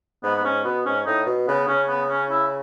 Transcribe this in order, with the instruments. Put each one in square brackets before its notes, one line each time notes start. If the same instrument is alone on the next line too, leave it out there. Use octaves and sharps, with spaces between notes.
[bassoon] G#2 [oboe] B3
[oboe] B3
[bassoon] G#2 [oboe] C#4
[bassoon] B2 [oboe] B3
[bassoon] G#2 [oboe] C#4
[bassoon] A2 [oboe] D#4
[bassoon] B2
[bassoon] C#3 [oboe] B3
[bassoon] C#3 [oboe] C#4
[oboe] B3
C#4
E4